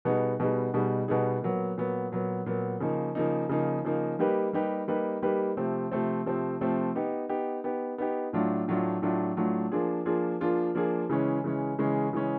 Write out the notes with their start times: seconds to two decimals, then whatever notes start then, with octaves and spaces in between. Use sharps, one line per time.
0.05 B2 G3 B3 D#4 G#4
0.40 B2 G3 B3 D#4 G#4
0.74 B2 G3 B3 D#4 G#4
1.08 B2 G3 B3 D#4 G#4
1.42 A#2 F#3 B3
1.77 A#2 F#3 B3
2.12 A#2 F#3 B3
2.46 A#2 F#3 B3
2.80 C#3 F3 A#3 D#4
3.15 C#3 F3 A#3 D#4
3.49 C#3 F3 A#3 D#4
3.84 C#3 F3 A#3 D#4
4.19 G3 A#3 D#4 G4 B4
4.53 G3 A#3 D#4 G4 B4
4.88 G3 A#3 D#4 G4 B4
5.22 G3 A#3 D#4 G4 B4
5.57 C3 F3 A3 C4
5.92 C3 F3 A3 C4
6.26 C3 F3 A3 C4
6.60 C3 F3 A3 C4
6.95 B3 D#4 G4
7.29 B3 D#4 G4
7.64 B3 D#4 G4
7.98 B3 D#4 G4
8.33 A2 F#3 A3 D4 F4
8.68 A2 F#3 A3 D4 F4
9.02 A2 F#3 A3 D4 F4
9.37 A2 F#3 A3 D4 F4
9.72 F3 A#3 D4 F4 G#4
10.06 F3 A#3 D4 F4 G#4
10.40 F3 A#3 D4 F4 G#4
10.75 F3 A#3 D4 F4 G#4
11.09 C#3 E3 G#3 C#4
11.44 C#3 E3 G#3 C#4
11.79 C#3 E3 G#3 C#4
12.13 C#3 E3 G#3 C#4